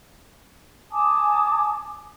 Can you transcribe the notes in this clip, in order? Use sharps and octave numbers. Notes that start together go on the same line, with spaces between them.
G#5 A5 D6 D#6